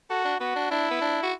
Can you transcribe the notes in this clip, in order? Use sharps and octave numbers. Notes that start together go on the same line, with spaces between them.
F#4 A4
D4
B3 F#4
D4
D4 E4
B3
D4
F#4